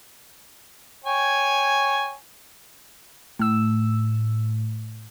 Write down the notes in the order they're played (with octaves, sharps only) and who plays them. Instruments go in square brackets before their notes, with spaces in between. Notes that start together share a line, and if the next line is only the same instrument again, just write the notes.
[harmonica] C#5 G5 G#5
[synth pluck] A2 E6